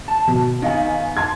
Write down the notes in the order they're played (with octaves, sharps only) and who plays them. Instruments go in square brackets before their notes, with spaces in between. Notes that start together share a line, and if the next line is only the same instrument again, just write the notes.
[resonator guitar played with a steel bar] A5
[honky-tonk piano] B2
[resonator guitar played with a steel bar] D#3 B3 [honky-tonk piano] D#4 F5 G#5
[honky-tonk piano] A5 C6 G#6